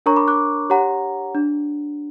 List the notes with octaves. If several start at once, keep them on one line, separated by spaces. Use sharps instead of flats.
D4 A#4 C#5 A#5 C#6
B5 D6
D6 F#6
G4 C#5 F#5 A#5
D4